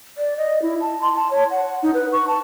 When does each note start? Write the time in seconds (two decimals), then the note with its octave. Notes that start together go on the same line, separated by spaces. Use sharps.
0.18 D5
0.37 D#5
0.62 E4
0.81 A5
1.02 C6
1.15 A5
1.31 C#5
1.51 F#5
1.83 D#4
1.94 B4
2.13 C#6
2.28 A5